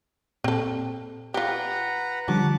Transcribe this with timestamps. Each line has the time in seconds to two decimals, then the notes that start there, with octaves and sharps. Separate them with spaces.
0.44 A#2 C4 A4
1.34 F4 G4 B4 F#5 A#5
2.28 D3 F3 G3 C#4 F#5 A5 D6